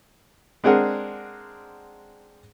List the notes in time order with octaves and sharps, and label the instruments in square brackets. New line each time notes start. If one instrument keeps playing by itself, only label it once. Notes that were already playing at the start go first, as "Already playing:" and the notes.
[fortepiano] G#3 C4 D4 G#4 A#4 F#5